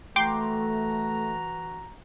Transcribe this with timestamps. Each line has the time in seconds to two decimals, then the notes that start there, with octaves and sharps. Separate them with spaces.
0.16 E3 A3 F#4 G5 A#5 C6 D6